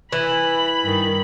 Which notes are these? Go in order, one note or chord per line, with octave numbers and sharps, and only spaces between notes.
E3 B5
G2 D#3